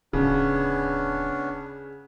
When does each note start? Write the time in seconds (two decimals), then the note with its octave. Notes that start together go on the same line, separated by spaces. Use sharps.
0.13 D1 C#3 B3 C#4 D4